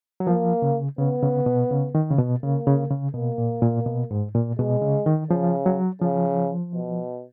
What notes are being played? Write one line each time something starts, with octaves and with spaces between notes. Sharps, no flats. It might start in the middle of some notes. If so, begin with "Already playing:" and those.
F#3
F3 A#3
C#3
C#3 B3
C#3
B2
C#3
D#3
C#3
B2
C#3 A#3
C#3
C#3
B2 A#3
A#2
A#2
B2
G#2
A#2
B2 G#3
C#3
D#3
C#3 F3
F#3
C#3 F3
B2